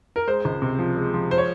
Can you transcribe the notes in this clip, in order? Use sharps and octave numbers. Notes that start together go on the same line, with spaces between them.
A#4
G#3 C5
C#2
C3
F3
G#3
F3
C5
C#5